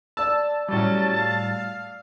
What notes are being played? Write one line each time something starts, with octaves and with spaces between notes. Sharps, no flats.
D5 A5 E6
A2 F#3 G3 C#4 A5
F5